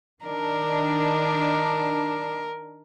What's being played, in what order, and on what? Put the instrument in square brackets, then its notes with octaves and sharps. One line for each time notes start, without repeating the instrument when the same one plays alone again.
[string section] D#3 D4 [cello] A#4